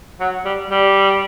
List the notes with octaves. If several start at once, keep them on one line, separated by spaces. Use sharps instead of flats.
F#3
G3
G3